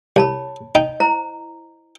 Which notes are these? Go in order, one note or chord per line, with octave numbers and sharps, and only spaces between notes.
C2 C#5 A5 B5
D#4 D#5 G5
E4 C5 A#5